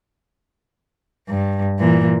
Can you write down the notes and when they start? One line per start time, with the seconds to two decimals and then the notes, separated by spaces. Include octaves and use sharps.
1.28 G2
1.79 A#2 E3